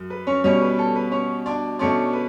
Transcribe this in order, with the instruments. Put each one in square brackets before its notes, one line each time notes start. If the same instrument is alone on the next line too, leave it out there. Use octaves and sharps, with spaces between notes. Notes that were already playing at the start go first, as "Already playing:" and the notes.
Already playing: [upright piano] F#2
B4
C#4 C#5
B2 G3 C#4 C#5
B4
A4
B4
C#4 C#5
D4 D5
B2 A3 C#4 D4 D5
B4